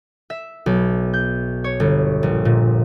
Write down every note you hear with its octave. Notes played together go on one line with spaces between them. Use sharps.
E5
B1
G6
C#5
G1
A#1
A#2